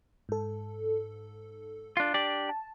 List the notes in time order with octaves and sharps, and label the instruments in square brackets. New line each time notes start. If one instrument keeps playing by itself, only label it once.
[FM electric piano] G#2 A4
[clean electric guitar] D4 F4
D4 G4 D5
[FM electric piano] A5